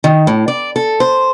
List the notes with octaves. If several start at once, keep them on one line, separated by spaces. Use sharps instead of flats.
D#3
A2
D5
A4
C5